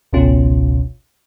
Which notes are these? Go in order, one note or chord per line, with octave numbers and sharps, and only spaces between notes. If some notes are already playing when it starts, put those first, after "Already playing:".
G#1 C#2 B2 C#4 F4